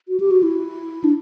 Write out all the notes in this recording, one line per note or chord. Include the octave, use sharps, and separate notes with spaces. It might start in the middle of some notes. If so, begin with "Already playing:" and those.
F#4
G4
F#4
E4
D4